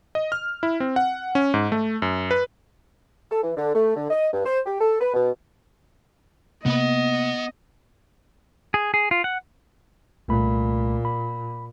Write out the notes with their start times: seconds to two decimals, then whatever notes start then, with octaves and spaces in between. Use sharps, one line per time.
0.15 D#5
0.32 F6
0.63 E4
0.80 C4
0.96 F#5
1.35 C#4
1.54 G#2
1.72 A3
2.02 F#2
2.31 B4
3.31 A4
3.43 E3
3.57 D3
3.75 A3
3.96 D3
4.11 D#5
4.33 G2
4.46 C5
4.66 G4
4.80 A4
5.01 B4
5.14 B2
6.66 C3 A#3 B3 D#5 F#5
8.74 G#4
8.94 G#4
9.11 F4
9.24 F#5
10.28 C2 A#2 A3 B5
11.05 B5